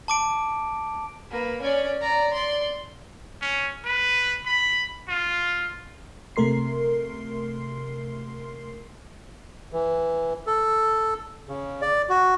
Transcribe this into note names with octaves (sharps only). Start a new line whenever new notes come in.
A5 D6 D7
A#3 B4
C#4 D5
D5 A#5
D5 C6
C#4
B4
B5
F4
C3 A3 A#4 C6 C7
E3
A4
C#3
D5
F#4